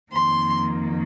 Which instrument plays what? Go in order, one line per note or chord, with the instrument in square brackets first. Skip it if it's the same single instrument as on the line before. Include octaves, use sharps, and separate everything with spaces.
[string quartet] F2 D#3 A#3 C6